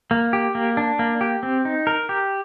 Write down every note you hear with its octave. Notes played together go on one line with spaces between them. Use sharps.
A#3
G4
A#3
D4
A#3
G4
C4
D#4
A#4
G4